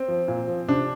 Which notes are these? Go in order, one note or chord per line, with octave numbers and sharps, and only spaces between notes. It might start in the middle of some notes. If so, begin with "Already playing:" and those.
Already playing: C4
F3
A#2
F3
C3 D4